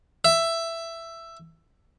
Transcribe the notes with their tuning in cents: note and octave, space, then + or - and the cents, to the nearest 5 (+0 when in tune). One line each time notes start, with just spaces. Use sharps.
E5 +10